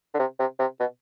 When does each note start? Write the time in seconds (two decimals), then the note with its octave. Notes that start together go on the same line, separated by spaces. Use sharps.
0.14 D3
0.19 C3
0.39 C3
0.59 C3
0.80 B2